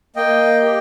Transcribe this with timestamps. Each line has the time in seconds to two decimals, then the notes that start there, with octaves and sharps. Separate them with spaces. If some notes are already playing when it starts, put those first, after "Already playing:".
0.16 A#3 D#5 G5
0.62 G4